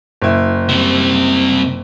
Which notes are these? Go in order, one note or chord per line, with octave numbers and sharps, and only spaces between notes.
F#1 E4
C3 G3